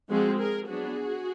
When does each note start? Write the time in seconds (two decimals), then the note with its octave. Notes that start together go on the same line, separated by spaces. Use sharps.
0.10 F3 G#3 C4 F#4 G#4
0.39 G#4 A#4
0.67 F#3 B3 D4 F#4 G#4